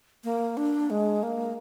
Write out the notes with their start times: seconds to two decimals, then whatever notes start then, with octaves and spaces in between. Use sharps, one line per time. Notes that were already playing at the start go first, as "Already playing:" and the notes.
0.24 A#3
0.57 D4
0.90 G#3
1.23 A#3